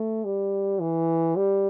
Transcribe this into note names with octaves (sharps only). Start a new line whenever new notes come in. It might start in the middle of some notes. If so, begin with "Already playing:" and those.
Already playing: A3
G3
E3
G3